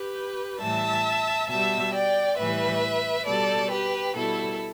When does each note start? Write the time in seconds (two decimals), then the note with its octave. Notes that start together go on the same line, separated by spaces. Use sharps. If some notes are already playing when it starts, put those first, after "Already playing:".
Already playing: G4 B4
0.61 A2 E3 G3 E5 A5
1.50 B2 G3 E5 A5
1.94 D5 G5
2.39 A2 E3 G3 B4 E5
3.27 B2 G3 A4 D5
3.72 G4 B4
4.16 B2 G3 E4 A4